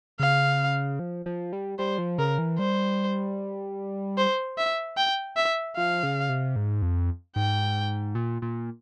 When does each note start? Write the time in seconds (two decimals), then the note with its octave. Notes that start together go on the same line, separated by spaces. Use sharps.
0.20 C#3 F5
0.99 F3
1.26 F3
1.53 G3
1.79 G3 C5
1.98 F3
2.18 C#3 A#4
2.38 E3
2.59 G3 C5
4.18 C5
4.58 E5
4.97 G5
5.37 E5
5.77 F3 F5
6.03 C#3
6.29 C3
6.56 G#2
6.82 F2
7.36 G#2 G5
8.15 A#2
8.42 A#2